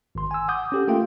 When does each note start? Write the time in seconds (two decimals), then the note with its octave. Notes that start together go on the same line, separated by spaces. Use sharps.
0.15 G#1 C6
0.31 G#5 E6
0.48 F#5 D6 D#6 G6
0.72 C#4 G4 A4
0.88 A3 A#3 F4 A4 F5 G5